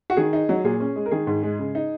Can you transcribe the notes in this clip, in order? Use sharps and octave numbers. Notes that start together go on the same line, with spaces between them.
F#4
D#3 G#4
D#4
F#3
A#2 G#4
C#4
G#3
A#4
D#3 G#4
G#2
G#3
C#3
D#4